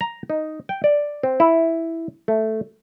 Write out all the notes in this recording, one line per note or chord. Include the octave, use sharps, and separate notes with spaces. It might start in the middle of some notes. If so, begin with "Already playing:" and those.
A#5
D#4
G5
D5
C4
E4
A3